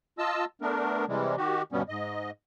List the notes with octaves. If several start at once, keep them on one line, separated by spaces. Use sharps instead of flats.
F4 D#5 A5 E6
A3 B3 D4 A#4
C3 E3 G3 G#3
D#3 F#4 G4
D2 G2 B2 G3 B3 C#4
G#2 D#5